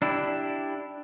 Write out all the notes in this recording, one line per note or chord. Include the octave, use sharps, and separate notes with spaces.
D4 E4 G4